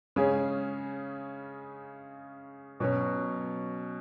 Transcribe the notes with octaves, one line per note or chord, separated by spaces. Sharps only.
C#3 G#3 C#4 G#4
B2 F#3 C#4